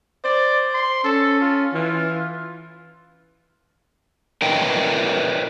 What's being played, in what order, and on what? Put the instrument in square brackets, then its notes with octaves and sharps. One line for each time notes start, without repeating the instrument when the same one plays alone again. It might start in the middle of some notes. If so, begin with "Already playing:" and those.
[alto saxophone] C5 [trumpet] D5
[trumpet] C6
[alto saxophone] C#4 [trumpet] A4
[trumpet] F4
[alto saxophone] E3 [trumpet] F4
[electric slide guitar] A#4 B4 C#5 D#5 E5 G5